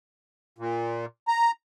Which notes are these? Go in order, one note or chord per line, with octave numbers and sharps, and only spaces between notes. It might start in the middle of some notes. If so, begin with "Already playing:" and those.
A#2
A#5